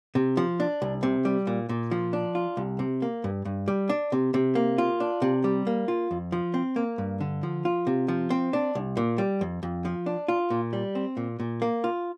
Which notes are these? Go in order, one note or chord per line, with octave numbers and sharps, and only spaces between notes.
C3
F3
D4
C2
C3
G3
A#2
A#2
F3
D4
F4
C2
C3
A#3
G2
G2
G3
D4
C3
C3
A#3
F4
D4
C3
G3
A#3
F4
F2
F3
C4
A#3
G2
D3
F3
F4
C3
F3
C4
D4
C2
A#2
G3
F2
F2
F3
D4
F4
A#2
G3
C4
A#2
A#2
A#3
F4